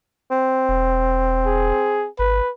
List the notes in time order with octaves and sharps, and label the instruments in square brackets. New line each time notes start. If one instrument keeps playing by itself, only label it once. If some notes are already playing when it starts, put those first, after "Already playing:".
[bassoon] C4
[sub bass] E1
[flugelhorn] G#4
[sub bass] G#1 [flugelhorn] B4